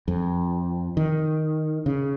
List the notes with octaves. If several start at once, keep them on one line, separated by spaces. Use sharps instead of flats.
F2
D#3
C#3